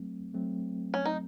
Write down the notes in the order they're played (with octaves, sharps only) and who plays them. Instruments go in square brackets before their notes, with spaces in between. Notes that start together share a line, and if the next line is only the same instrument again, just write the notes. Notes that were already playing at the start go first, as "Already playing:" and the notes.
Already playing: [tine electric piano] F#3 A3 C4
F#3 A3 C4
[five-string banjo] C#4
D#4